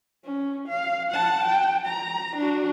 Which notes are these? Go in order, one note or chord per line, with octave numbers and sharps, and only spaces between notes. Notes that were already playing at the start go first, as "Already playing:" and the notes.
C#4
F5
F#5 A5
G5
A#5
D4 F#4